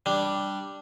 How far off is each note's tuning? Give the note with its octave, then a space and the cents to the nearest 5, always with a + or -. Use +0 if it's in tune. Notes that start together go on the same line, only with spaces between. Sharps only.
G3 +0 D4 +0